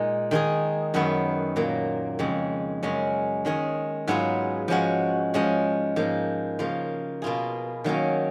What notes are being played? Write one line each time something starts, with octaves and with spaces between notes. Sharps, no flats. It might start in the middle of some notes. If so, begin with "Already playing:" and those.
Already playing: A#2 G#3 D#4
D#3 G#3 D#4 G#4
F#2 D#3 F#3 B3 F#4
A#2 F#3 A#3
F2 C#3 G#3
F#2 C#3 G#3 C#4
D#3 G#3 C#4 G#4
G#2 F#3 B3 F4 G#4
F3 G#3 C#4 F#4
F3 G#3 C#4 G#4
G#2 F3 A#3
C#3 F3 A#3 F4
B2 A#3 F4 G#4
D#3 F#3 A#3 C#4